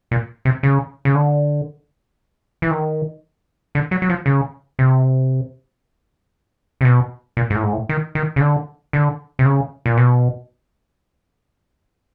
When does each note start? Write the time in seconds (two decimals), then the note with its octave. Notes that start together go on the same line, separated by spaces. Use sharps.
0.11 A#2
0.45 C3
0.63 C#3
1.05 C#3
1.15 D3
2.62 E3
2.71 D#3
3.75 D3
3.91 F#3
4.02 F#3
4.09 F3
4.26 C#3
4.79 C3
6.81 C3
6.85 B2
7.37 A#2
7.50 G#2
7.55 A2
7.63 G#2
7.73 A2
7.89 D#3
8.15 D#3
8.36 C#3
8.41 D3
8.93 D3
9.39 C3
9.45 C#3
9.86 A#2
9.97 B2